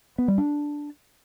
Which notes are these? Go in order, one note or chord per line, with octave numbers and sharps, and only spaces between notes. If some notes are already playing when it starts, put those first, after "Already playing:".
B3
G3
D4